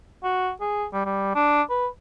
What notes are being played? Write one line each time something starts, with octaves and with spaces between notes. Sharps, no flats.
F#4
G#4
G3
G3
D4
B4